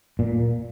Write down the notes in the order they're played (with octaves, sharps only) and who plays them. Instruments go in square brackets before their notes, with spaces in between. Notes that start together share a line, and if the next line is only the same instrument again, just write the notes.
[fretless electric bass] A#2